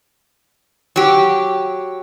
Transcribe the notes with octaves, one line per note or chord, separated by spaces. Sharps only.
F#3 G4